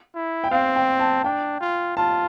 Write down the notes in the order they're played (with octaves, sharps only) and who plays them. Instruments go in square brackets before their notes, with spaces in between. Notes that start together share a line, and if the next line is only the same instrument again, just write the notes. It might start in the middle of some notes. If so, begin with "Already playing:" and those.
[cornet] E4
[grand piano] G5
[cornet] C4 [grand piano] F5
[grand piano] G5
A5
[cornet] D4 [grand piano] G5
[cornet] F4
[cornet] F4 [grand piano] A5